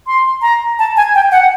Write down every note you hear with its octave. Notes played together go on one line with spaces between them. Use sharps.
C6
A#5
A5
G#5
G5
F#5